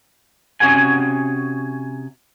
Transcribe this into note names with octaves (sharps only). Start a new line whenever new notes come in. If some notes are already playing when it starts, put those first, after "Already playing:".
C3 C#4 F#4 G#4 F#5 G#5